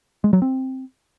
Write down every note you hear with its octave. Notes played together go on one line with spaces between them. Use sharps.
G#3
F#3
C4